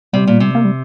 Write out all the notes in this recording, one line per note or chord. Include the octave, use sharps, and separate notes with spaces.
C3 G3
A#2
C3
A#3
G3